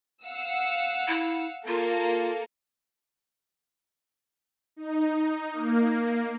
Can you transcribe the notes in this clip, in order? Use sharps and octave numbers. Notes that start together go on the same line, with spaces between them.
F5 F#5 E6
E4
A#3 F4 A4 A#4
D#4
A#3